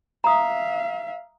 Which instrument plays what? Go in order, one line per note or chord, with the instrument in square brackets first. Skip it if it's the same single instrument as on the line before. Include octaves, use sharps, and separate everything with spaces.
[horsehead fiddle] E5 F5 [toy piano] A#5 D#6